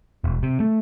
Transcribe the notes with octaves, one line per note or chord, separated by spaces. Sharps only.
E1
C3
A3